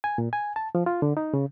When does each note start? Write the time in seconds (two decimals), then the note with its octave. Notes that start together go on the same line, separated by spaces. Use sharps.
0.04 G#5
0.18 A#2
0.33 G#5
0.56 A5
0.75 F3
0.86 F4
1.02 D3
1.17 D#4
1.34 C#3